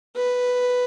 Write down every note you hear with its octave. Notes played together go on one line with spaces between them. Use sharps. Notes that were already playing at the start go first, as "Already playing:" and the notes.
B4